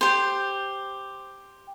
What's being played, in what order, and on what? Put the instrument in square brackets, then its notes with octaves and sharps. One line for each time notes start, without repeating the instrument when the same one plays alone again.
[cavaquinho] G4 C5